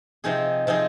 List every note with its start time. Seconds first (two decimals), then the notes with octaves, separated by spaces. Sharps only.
0.24 C3 F3 C4 D#4 G#4
0.67 C3 F3 C4 D#4 G#4